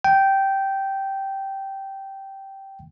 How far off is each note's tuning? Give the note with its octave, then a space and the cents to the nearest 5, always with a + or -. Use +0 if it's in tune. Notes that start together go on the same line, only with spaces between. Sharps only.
G5 -10